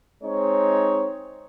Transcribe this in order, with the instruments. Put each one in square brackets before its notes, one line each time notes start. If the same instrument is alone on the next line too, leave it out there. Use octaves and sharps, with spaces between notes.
[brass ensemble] G#3 C4 D#4 C#5